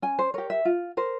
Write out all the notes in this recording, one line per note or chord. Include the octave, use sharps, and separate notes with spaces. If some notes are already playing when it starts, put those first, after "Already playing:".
C#4 G#5
C5
G4 A#4 C#5
E5
F4
A#4 C5